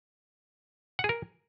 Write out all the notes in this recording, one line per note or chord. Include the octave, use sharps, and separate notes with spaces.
F#5
G#4
A#4